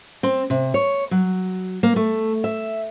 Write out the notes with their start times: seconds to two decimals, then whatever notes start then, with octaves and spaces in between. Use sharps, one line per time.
0.23 C4
0.50 C3
0.74 C#5
1.11 F#3
1.83 A#3
1.96 A3
2.44 E5